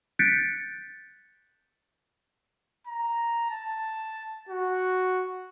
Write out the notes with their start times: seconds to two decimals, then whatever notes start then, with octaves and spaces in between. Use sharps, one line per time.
0.19 F#6 G6 A6 B6 C#7 D7
2.87 A#5
3.50 A5
4.49 F#4